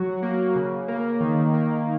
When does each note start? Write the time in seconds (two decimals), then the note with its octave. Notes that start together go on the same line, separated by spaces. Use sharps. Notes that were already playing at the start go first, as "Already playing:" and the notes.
Already playing: F#3 F#4
0.23 A#3
0.56 C#3
0.88 A#3
1.20 D#3
1.54 A#3